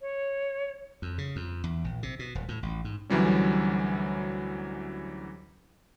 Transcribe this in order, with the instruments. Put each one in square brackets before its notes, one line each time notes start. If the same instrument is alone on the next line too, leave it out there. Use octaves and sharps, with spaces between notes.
[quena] C#5
[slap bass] F2
C#3
F2
E2
A#1
C3
B2
D#1
A2
A1
G#2
[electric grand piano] D2 E3 F#3 G3 C#4